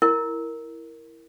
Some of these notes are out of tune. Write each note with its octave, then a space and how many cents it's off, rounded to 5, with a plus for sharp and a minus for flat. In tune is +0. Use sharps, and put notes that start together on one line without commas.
E4 +0 A#4 +0